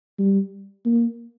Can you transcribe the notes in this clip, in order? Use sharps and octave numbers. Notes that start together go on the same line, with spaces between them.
G3
A#3